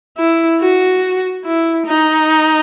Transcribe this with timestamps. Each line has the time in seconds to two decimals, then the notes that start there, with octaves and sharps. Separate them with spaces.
0.18 E4
0.61 F#4
1.45 E4
1.86 D#4